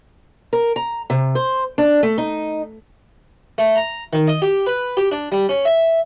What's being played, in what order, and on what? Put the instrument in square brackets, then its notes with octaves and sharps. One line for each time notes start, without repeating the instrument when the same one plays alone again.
[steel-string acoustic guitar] A#4
A#5
C3
C5
D4
A3
D#4
[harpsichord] A3
A#5
D#3
D#5
G4
B4
G4
D4
G3
C#4
E5